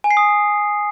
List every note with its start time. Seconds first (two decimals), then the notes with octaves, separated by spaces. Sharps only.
0.04 G#5
0.11 C7
0.17 D#6